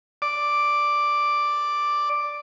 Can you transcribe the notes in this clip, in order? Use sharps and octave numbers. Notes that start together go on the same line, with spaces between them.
D5 D6